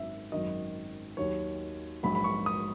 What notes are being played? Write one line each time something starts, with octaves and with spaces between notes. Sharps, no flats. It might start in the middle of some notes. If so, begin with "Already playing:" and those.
Already playing: G#1 F#2 D#3 E5
G#1 F#2 D#3 F#3 D#5
D#2 D#3 F#3 C#5
A#1 G#2 F#3 B5
B5
C#6
D#6